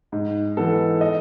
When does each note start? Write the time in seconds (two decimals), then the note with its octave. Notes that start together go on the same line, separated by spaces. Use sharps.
0.12 G#2
0.57 E3 B3 A4
1.01 D#5